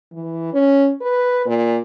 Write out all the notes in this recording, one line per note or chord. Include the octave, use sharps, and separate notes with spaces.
E3
C#4
B4
A#2